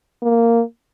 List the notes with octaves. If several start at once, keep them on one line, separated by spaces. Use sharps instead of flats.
A#3